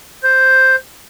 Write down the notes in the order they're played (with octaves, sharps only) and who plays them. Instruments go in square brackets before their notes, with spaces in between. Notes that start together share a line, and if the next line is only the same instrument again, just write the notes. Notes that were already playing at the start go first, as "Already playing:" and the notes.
[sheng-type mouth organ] C5